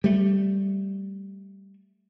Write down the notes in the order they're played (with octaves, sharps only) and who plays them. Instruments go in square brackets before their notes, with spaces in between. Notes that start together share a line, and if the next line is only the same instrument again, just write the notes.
[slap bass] G3 A3